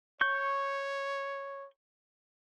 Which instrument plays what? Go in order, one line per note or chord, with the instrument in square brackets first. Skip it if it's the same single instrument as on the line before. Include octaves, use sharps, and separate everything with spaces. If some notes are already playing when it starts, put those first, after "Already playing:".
[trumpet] C#5 [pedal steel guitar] C#6 G6